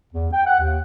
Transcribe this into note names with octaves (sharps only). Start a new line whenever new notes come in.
E2
G5
F#5
D#2